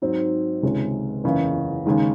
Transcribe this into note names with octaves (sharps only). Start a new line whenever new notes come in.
G#2 F#3 C4 D#4
C#2 C3 D#3 G#3 C#4
F#1 E2 C#3 E3
D#2 C#3 G#3 D#4